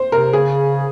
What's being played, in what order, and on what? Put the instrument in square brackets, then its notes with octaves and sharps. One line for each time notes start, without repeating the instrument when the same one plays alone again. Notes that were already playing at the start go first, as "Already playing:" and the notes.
Already playing: [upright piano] C5
[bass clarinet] C3 [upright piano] A#4
[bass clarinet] C#3 [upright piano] G#4